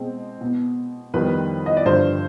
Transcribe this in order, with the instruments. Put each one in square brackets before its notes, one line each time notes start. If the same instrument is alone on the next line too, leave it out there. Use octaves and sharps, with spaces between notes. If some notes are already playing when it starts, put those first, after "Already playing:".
Already playing: [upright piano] B2 G#3 C4
B2 B3
F2 D#3 G3 B3 B4
D#5
D5
G2 D3 F3 C5